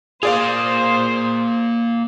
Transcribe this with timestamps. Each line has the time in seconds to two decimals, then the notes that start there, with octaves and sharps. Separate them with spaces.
0.23 A#3 F4 G#4 C5 D5 F5